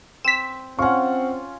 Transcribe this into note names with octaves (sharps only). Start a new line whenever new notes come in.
C4 B6 E7
C4 C#4 F4 F#5 C#6